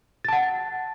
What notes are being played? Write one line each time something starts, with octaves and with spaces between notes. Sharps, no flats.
F#5 A5 A6